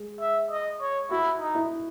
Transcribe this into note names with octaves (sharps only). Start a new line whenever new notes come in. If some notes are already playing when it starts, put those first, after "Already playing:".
Already playing: G#3
E5
D#5
C#5
E4 F#4
D#4
E4